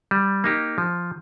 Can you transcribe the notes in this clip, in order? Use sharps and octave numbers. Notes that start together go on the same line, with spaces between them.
G3
A#3 D#4 G4
F3